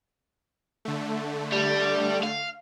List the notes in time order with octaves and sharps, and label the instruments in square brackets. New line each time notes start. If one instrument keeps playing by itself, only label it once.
[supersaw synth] D3 A3
[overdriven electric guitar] G3
F5